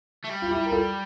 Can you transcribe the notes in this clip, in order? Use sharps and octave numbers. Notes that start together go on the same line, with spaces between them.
A3
G3
F4
E4 G4
A#4
F4 A4